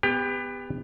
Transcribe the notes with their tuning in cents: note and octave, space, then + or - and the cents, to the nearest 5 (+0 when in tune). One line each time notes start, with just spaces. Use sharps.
B3 +10 G4 +30 G5 +0